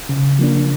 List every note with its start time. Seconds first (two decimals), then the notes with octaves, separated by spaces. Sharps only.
0.09 C#3
0.39 F3 A#3 D4